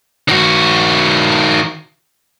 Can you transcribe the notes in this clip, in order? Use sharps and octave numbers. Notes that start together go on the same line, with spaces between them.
D#3 F#4